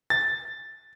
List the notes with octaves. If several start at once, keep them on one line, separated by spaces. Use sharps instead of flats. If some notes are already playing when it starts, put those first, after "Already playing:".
A6